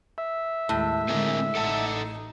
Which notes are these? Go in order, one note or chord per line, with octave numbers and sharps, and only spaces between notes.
E5
D#2 A2 G#3
D3 G#3 C4 G#4 A#4
A1 D#4 A4 F#5 A5